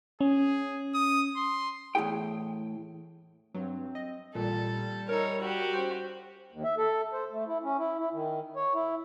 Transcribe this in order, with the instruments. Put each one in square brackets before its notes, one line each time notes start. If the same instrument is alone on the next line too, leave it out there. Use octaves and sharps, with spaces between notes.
[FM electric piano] C#4 [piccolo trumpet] G#4
[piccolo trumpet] D#6
C6
[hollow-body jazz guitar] E2 A2 C3 E4 G#4 G5
[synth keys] G2 F#3 [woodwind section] C4
[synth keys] D#5
[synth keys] A1 A#2 [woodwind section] G3 [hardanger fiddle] A4
[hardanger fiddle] D#4 C#5 [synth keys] A#4 E6
[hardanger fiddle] F#4 G4
[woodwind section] G#2 C#4 G5 [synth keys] C5
[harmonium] D#2
E5
A4
C5
A3
E4
C#4
E4
E4
D#3
C#5
E4